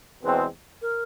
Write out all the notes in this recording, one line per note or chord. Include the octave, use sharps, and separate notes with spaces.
E2 B2 G#3 C4 B4
A#4